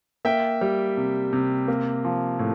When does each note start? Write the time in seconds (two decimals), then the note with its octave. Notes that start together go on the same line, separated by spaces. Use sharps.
0.25 A#3 E5 G5
0.61 G3
0.97 C3
1.33 C3
1.68 A#3
2.04 F3
2.39 A2